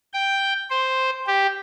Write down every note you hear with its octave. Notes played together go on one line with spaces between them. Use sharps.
G5
C5
G4